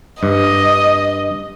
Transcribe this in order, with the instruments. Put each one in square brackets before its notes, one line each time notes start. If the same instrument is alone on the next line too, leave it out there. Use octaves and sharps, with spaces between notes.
[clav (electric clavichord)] G2 [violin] D#5